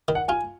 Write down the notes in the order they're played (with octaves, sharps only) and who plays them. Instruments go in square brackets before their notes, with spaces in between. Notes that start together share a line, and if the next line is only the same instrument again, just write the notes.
[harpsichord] D#3
[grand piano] F#5
[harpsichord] F4 [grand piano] G#5